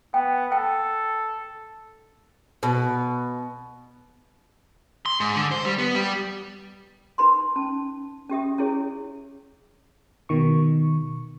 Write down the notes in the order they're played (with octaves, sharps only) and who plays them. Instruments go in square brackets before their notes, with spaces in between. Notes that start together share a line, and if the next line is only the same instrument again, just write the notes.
[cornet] B3 [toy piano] G5
[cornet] A4 [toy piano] G5
[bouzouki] B2
[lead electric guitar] C6
G#2
D3
C5
G3
B3
G3
[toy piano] D#4 B4 B5 C6
C#4 A5
C#4 G4 E5 D#6
C#4 E4 G#4 C#5
[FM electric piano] B2 D#3 C#6